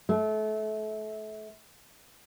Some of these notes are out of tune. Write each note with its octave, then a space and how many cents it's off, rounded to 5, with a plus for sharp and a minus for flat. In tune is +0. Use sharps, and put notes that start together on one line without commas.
A3 -30